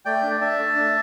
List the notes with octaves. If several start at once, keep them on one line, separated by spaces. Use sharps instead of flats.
A3 D5 G5
D4
D4 E5 A5
A3
D4